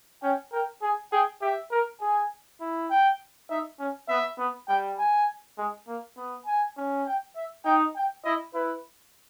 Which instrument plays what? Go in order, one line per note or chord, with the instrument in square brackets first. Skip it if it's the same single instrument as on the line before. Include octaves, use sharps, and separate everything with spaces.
[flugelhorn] C#4 [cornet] G5
[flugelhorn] A#4 [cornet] G5
[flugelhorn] G#4 [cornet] G#5
[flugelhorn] G#4 [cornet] G5
[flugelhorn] G4 [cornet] E5
[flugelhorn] A#4
[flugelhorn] G#4 [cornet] G#5
[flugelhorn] E4
[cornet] G5
[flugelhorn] D#4 [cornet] E5
[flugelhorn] C#4
[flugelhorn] B3 [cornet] E5
[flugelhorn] B3
[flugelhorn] G3 [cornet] G5
[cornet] G#5
[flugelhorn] G#3
A#3
B3
[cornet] G#5
[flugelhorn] C#4
[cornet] G5
E5
[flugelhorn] D#4 [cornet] G5
[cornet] G5
[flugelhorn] E4 [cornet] D#5
[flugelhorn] E4 [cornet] B4